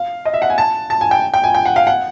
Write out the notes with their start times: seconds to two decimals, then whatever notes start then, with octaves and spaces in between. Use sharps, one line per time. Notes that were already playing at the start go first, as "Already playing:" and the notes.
Already playing: F5
0.25 D#5
0.34 E5
0.42 F#5
0.50 G#5
0.58 A5
0.90 A5
1.01 G#5
1.11 G5
1.34 G5
1.44 G#5
1.55 G5
1.65 F#5
1.76 F5
1.87 F#5